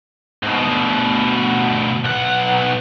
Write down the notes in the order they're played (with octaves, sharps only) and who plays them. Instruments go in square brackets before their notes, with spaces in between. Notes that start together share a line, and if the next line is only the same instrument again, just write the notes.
[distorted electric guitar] G#2 B2
D2 B2
B1 F#5